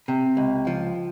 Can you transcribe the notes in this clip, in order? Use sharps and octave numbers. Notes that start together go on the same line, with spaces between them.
C3
C#2
F3